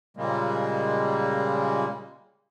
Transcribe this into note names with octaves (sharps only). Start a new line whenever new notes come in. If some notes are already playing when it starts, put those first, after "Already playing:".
A#2 C#3 G3 G#3 A#3